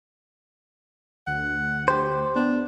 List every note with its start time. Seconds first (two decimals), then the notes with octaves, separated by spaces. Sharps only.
1.27 D2 F#5
1.88 G4 C5
2.36 B3 D4